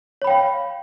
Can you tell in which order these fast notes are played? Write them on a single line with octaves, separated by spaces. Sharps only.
C#5 B5 G5 F5